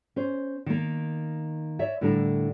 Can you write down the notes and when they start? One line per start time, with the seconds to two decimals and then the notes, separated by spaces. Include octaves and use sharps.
0.16 C#4 C5
0.66 D#3 A#3
1.79 C#5 D5 E5
2.01 A2 D3 G3 D4 A#4